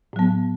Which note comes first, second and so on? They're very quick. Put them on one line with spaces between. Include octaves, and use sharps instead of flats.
A2 F#3 B3